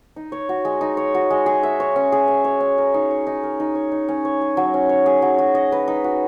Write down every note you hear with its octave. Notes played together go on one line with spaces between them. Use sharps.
D#4
C#5
F#4
G#3
D#4
C#5
F#4
G#3
G#4
E5
C#5
C#4
G#4
E5
C#5
C#4
A#4
D#4
C#5
D#4
A#4
D#4
C#5
D#4
C#4
C#5
G#4
F#3
C#4
C#5
G#4
F#3
F#4
D#5
B4
D#4
F#4